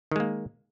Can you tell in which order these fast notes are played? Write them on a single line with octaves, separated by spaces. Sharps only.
D#3 G#3 A#3